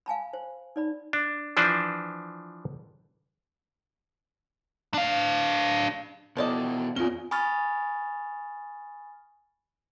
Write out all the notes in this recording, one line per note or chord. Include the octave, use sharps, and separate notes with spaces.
F5 G#5 A5 B5
C5
D#4 D5 B5
D4
E3 F3 D4 B4 C5
D4 F5
B2 F3 E4 A4 D5 D#5
E2 C4 C#4 D#4 F4 G7
G#5 B5 C#6 D#6 F6 A6